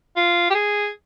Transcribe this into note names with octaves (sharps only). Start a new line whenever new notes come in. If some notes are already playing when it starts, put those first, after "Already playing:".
F4
G4
G#4